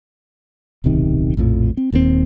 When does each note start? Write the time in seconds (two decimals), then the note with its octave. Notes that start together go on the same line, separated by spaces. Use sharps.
0.84 D1 B1 C3 D#3
1.37 A#1 F2 A2 F3
1.77 C4
1.92 D#1 D#2 A2 C4